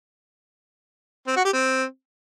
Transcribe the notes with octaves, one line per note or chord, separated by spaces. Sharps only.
C4
F#4
G4
C4